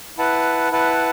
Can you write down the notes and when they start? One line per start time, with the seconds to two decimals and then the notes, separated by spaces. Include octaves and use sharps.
0.18 E4 B4 F#5 A5
0.71 E4 B4 F#5 A5